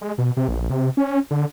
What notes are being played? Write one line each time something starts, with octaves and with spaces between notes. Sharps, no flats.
G#3
B2
C3
A#1
C3
C#4
D3